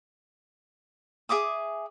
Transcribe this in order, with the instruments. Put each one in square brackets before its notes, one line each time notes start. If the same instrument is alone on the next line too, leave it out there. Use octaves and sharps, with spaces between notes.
[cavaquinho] G#4 E5 D6 D#6